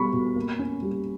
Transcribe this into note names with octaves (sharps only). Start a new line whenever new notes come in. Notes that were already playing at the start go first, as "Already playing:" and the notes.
Already playing: B2 G3 B3 B5 C#6
B2
A#3
C#4
G3